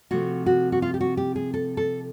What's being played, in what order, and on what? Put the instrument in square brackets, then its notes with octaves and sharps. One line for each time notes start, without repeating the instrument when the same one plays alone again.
[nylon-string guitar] C3 F3 A3 C4 F#4
F#4
F#4
F4
G4
F#4
G4
G#4
A4
A4